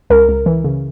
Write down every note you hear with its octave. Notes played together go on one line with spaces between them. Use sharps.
C#2 A#4
C#2
E3
C#3